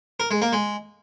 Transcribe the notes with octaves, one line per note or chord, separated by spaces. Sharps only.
A#4
G#3
A#3
G#3